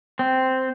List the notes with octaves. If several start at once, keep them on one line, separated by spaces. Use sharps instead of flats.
C4